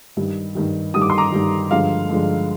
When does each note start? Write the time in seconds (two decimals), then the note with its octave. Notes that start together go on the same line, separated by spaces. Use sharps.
0.17 G2 D#3 G3
0.55 G2 D#3 G3
0.94 G2 D#3 G3 D#6
1.02 D6
1.10 C6
1.18 A#5 D6
1.32 G2 D#3 G3
1.71 G2 D3 F3 G#3 F5
2.10 G2 D3 F3 G#3